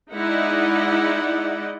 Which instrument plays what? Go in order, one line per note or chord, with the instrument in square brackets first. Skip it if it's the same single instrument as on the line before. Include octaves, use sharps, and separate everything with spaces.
[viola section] G#3 D#4 E4 D5 D#5 F#5